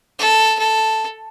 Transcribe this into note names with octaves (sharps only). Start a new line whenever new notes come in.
A4
A4